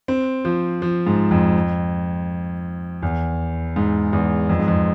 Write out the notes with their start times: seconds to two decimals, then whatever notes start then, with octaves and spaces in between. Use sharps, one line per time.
0.08 C4
0.45 F3
0.82 F3
1.07 G#2
1.31 F2
3.02 E2
3.76 G#2
4.13 E2
4.50 F2
4.59 G#2
4.68 F2